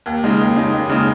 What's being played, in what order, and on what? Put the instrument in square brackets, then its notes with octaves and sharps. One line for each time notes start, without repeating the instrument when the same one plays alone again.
[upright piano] D#2
C#3 G#3 D#4
D#2
C#3 G#3 D#4
D#2
C#3 G#3 D#4